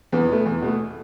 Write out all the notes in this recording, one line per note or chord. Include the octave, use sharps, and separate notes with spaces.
E2 B3
B2 A3
E2
B2 A3